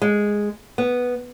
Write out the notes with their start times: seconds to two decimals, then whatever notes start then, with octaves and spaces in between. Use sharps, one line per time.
0.02 G#3
0.78 B3